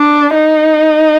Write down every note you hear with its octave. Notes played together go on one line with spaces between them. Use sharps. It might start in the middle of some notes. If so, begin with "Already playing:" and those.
Already playing: D4
D#4